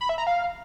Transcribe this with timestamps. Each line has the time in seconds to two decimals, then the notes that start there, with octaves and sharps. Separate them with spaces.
0.01 B5
0.09 E5
0.18 A#5
0.27 F5